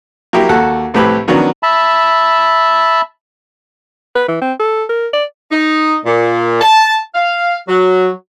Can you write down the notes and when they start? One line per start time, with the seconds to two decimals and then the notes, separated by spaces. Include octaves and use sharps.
0.33 F#3 A#3 E4 G4
0.49 D#2 F#4 A4 F#5
0.94 C2 A2 C4 G4 B4 B5
1.28 D#3 F#3 B3 C#4 D4
1.63 E5 A5 B5
4.16 B4
4.28 E3
4.42 C4
4.60 A4
4.89 A#4
5.13 D5
5.51 D#4
6.06 A#2
6.62 A5
7.14 F5
7.68 F#3